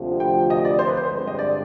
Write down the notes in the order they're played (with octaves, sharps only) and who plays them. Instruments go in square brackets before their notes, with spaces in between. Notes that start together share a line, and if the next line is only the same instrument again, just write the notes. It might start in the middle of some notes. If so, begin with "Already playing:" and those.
Already playing: [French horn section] D2 C3 F3
[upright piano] G5
D#5
D5
C5
B4
C5
[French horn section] G2 D3 G#3 C4
[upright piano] D#5
D5